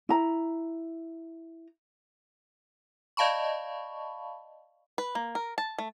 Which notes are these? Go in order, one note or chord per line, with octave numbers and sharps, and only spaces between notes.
E4 A#5
D5 D#5 F5 A5 B5 C#6
B4
A#3
A#4
A5
A3